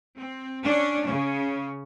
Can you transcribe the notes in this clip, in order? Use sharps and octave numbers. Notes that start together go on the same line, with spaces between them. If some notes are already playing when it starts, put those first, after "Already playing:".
C4
C#4 D4
C#3 C#4